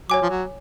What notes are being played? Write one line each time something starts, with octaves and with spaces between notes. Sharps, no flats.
F#3 C#5 G#5 D6
F3
F#3